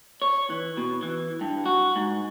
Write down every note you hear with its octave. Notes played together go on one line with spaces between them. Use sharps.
C#5
E3
B2
E3
G2
F#4
G#2